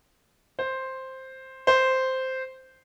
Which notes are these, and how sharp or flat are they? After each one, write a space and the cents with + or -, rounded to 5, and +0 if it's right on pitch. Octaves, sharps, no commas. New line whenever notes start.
C5 +5
C5 -5